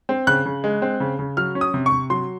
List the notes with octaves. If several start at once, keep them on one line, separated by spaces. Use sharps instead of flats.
C4
C#3 F#6
C#3
G#3
C4
C#3
C#3
F#3 F6
C#4
D#6
C3
C#6
C3
F#3 C6